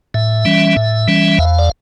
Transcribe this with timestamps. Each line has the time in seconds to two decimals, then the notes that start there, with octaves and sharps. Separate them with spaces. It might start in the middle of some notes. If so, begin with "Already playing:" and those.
0.14 A2 E5
0.45 E3 G3 C#4
0.77 A2
1.08 E3 G3 C#4
1.38 E2 F5
1.59 D5